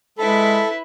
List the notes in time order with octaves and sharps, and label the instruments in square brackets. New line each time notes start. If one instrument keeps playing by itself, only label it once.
[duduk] G#3 [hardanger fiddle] E4 B4 [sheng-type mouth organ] A4